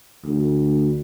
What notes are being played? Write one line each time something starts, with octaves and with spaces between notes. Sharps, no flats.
D2